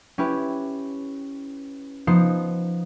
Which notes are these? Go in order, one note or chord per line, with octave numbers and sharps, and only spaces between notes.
C#4 E4 G4 B4
F3 B3 D#4 C5 C6